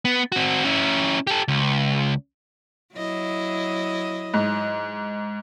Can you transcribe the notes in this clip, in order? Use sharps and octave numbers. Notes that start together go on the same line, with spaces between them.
B3
C4 F#4
C#4 E4
G4 A4
C#2
F#3 E4 D#5
G#2